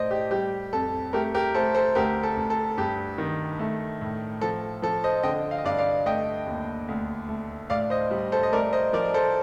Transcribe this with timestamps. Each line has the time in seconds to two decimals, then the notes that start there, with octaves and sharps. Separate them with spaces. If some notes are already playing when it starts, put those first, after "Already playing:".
Already playing: A2 A3 C5 D5 D#5
0.11 G4
0.31 G3 G4
0.72 F2 A4
1.13 A3 G4 A#4
1.34 G4 A#4
1.54 A3 A4 C5
1.75 A4 C5
1.95 D2 G4 A#4
2.23 A4
2.37 D2
2.50 A4
2.77 G2 G4
3.18 D#3
3.59 A3
4.01 A2
4.41 F3 A4
4.82 F3 A4
5.04 C5 D#5
5.23 D3 D#5 G5
5.51 F5
5.58 D#5
5.64 G2 D5 F5
5.79 D5 F5
6.06 A3 D#5 G5
6.47 D#2
6.88 D2
7.29 A3
7.70 A2 D5 F5
7.90 C5 D#5
8.11 G3
8.32 A4 C5
8.43 D#5
8.52 A3 A#4 D5
8.73 C5 D#5
8.93 F3 A#4 D5
9.14 A4 C5